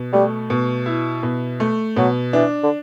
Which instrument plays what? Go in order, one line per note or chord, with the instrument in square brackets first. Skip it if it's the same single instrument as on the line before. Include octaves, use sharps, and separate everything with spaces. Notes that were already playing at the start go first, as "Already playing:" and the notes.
Already playing: [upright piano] B2
[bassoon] G3 [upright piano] A3
[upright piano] B2
E4
B2
A3
[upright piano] B2 [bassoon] F#3
[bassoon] E3 [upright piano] D4
[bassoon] D3